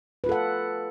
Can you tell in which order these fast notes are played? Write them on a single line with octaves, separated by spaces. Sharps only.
B4 F4 A4 F#5